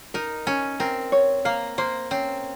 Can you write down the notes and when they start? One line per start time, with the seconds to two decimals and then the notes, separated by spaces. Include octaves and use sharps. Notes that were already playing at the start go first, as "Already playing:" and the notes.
0.14 D#4 A#4
0.47 C#4 G#5
0.80 C4 A#4
1.12 C#5
1.45 A#3 F5
1.78 A#3 C5
2.11 C4 C#4